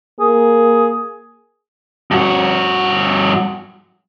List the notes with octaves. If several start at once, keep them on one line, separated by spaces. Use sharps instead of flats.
A#3 G#4
G2 F#4